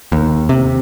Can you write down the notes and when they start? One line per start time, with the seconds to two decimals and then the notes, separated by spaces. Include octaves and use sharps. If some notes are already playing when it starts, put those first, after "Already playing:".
0.12 D#2
0.49 C3